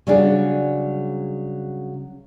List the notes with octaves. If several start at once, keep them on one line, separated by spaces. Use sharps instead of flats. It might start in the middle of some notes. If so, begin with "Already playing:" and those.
C#3 F#3 G3 C#4 D4 G#4